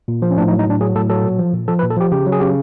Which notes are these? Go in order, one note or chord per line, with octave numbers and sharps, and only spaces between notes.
A#2
F3
C#4
A2 D4
D#4
F#3
D#4
A2 D4
F#3 G#4
A2 A4
F#3 A4
A#2
F3
A#2
F3 A4
B4
A#2
A4
F3 G4
C#3 G4
F#3
G#4
C#3 G4